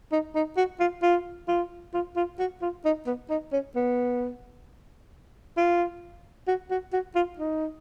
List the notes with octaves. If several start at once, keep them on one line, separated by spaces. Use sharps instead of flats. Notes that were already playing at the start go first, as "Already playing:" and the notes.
D#4
D#4
F#4
F4
F4
F4
F4
F4
F#4
F4
D#4
B3
D#4
C#4
B3
F4
F#4
F#4
F#4
F4
D#4